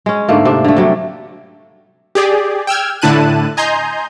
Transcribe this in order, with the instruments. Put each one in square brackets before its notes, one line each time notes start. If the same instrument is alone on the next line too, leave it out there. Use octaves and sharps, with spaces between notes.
[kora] G#3 C#4
G#2 D3 A3 A#3
C3 D4
D3 A3
C3 F#3 G3
[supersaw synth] G4 G#4 D5
G5 E6 F6 G#6
A2 D3 E4 A5 F#6 D#7
D#5 G#5 A#5 C6 G6